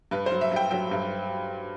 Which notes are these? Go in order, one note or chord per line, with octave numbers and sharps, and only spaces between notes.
G2 B4
C5
F#3
E5
G2 G5
F#3 G5
G2